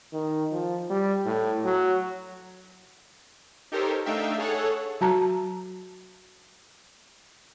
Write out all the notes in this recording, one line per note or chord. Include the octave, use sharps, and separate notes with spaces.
D#3
F3
G3
A2
F#3
D#4 G4 A4 A#4 C5 C#5
A3 D4 D#4 E5 F5 G5
G#4 A4 C#5 F#5
F#3 F#4 A5 A#5